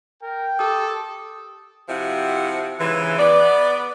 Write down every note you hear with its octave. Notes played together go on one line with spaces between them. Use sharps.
A#4 G5
G4 A4 D6 D#6
C3 F3 E4 F#4 G4
G#2 C#3 E3
B3 D5